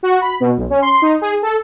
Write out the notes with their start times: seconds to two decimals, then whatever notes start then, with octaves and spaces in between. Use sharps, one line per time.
0.03 F#4
0.21 B5
0.40 B2
0.57 B1
0.70 C#4
0.82 C6
1.02 D#4
1.21 G#4
1.42 A4